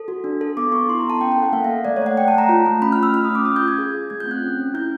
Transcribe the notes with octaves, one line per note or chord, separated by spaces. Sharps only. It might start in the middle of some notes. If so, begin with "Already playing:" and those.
Already playing: A4
F#4
D4
A4
B3 D6
B3 C#6
E4 C6
A#5
B3
A5
C#4 G5
G5
A4
F#5
A#3 F5
E5
A4
A3 D5
C#5
A3 F#5
A3 G5
A5
A3 A#5
F4
A3
C#4 B5
F6
A3
E6
F4 F6
D#6
C#4
D6
C#4 D#6
G6
F4
G#6
G#4
F4
A3 G#6
G6
C4
F#6
C#4
C#4
E4 G6